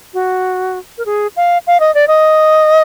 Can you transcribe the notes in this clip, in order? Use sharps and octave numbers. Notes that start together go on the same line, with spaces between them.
F#4
A#4
G#4
F5
F5
D#5
D5
D#5